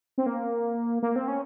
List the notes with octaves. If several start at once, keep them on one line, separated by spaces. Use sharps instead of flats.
C4
A#3
A#3
C4
C#4